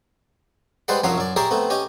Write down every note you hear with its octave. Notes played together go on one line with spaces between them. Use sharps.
G3 G#3 B4 C5 D5 F#5
C2 F#2 F3 F#3 C#5 F5
F#2 D5
G4 G#4 A#4 C#5 D5 E5
A3 B3 C4
C#4 G4 D#5